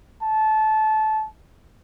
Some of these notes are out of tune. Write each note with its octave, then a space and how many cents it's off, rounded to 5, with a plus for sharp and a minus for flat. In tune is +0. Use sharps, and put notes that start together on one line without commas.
A5 -20